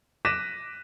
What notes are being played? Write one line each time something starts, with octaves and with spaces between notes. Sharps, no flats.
D6 F#6 A#6 B6 D#7 E7